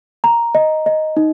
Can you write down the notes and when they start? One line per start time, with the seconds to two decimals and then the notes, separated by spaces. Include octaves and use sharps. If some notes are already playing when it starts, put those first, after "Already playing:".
0.24 A#5
0.55 D#5
0.86 D#5
1.17 D#4